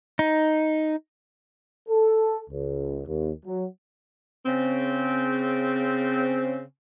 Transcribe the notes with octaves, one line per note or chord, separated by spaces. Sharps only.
D#4
A4
C#2
D#2
F#3
C#3 C4